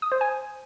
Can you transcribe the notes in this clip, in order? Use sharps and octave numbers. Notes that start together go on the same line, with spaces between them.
D#6
C5
G#5